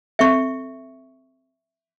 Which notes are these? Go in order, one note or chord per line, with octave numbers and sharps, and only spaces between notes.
C4 A4 E5 C#6 C#7